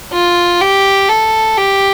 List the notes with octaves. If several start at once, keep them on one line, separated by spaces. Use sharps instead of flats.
F4
G4
A4
G4